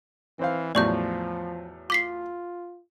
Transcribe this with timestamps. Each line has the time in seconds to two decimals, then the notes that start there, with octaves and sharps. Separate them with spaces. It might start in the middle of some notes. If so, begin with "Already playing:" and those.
0.39 E3 C4 C5 F5
0.75 E2 A2 F3 F#3 D5 C#6 G6
1.90 F4 D6 B6 C7